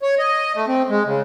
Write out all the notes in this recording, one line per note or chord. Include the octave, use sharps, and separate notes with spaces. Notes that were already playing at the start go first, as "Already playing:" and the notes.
C#5
D#5
A3
C4
G#3
C#3